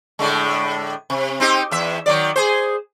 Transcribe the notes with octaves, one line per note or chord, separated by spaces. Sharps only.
A2 D3 G#3
C3
C4 D#4 G4
E2 E5
D#3 F#3 D5
G#4 C5